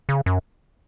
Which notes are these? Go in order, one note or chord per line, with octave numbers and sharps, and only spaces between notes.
C#3
F#2